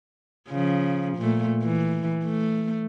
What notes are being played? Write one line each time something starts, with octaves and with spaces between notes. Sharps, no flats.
C#3 F3
A#2 A3
E3
A3